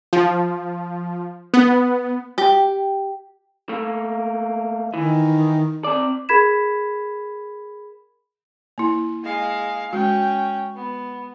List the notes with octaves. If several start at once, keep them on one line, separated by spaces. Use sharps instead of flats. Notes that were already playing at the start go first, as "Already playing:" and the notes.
F3
B3
G4
A3 A#3
D#3 E3
C4 D5
G#4 A#4 B5 G#6 B6 E7
A#3 E4
G#3 F5
G#3 C#4 F#4 G5
B3